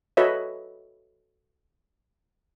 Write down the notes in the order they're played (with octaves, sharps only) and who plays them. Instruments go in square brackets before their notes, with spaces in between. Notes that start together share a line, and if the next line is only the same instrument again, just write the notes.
[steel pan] F#4 A4 B4 C#5 D#5 E5